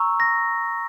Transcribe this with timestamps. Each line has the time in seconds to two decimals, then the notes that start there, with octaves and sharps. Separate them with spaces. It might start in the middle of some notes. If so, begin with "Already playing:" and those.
Already playing: A#5 C#6 E6
0.20 A#6